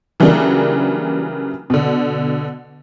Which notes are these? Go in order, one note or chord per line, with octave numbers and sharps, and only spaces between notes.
C#3 E3 F#3 G3 A#3 D4
B2 D3